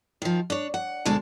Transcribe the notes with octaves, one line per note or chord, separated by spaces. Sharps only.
D#3 F3
D4 C#5
F#5
D2 B2 G#3 D4 A5